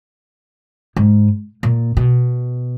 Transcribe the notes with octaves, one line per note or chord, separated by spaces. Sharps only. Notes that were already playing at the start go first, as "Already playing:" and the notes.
G#2
A#2
B2